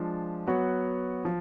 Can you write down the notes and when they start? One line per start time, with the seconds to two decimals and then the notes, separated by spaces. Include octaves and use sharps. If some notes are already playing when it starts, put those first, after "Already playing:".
Already playing: F3 G#3 D4 F4
0.46 F#3 B3 F#4 C#5
1.25 F3